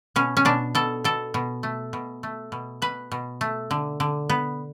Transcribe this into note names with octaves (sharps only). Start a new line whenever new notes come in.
B2 C#4
C#4
B2 D4
B2 A4
B2 A4
B2
A3
B2
A3
B2
B2 B4
B2
A3
D3
D3
B3